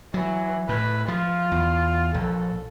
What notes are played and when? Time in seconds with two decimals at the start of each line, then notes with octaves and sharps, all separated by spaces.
0.14 E3 F#3
0.69 A2 B4
1.08 F3 F4
1.52 E2
2.14 A#1 A4